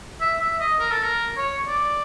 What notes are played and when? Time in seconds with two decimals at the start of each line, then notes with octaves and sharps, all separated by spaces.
0.21 E5
0.41 E5
0.60 D#5
0.79 A#4
0.92 A4
1.03 A#4
1.37 C#5
1.67 D5